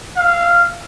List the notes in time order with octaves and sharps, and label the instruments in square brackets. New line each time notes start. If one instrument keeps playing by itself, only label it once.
[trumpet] F5